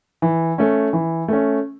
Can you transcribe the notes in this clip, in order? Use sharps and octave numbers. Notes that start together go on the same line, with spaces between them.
E3
A3 C#4
E3
A3 C#4